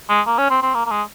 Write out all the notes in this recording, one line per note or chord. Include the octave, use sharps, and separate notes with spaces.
G#3
A#3
C#4
C4
C4
A#3
A#3
G#3